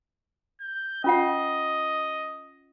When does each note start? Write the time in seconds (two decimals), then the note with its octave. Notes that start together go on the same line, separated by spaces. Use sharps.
0.61 G6
1.04 C#4 F4 D#5 F#5